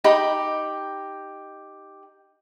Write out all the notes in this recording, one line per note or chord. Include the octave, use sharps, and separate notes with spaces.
D#4 G4 B5